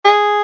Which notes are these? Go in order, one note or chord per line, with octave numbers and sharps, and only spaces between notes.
G#4